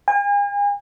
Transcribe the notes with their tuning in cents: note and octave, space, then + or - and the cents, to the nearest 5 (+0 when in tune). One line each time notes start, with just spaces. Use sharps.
G#5 -40